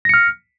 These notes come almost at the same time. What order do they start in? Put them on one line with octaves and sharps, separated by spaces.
A#6 C#7 F6